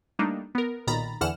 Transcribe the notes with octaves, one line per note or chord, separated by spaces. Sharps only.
G3 A3 A#3 D4 D#4
B3 A#4
B1 A#2 D#3 A#5 B5 A6
E2 D3 E3 F#5 F6 E7